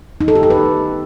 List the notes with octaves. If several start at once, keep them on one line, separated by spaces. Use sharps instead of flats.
D#4
A4
G4
A4
B4